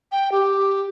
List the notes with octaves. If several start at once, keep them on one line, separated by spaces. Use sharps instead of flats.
G5
G4